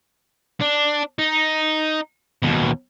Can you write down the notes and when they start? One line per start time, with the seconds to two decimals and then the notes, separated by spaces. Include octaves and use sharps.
0.61 D4
1.18 D#4
2.44 D#2 B2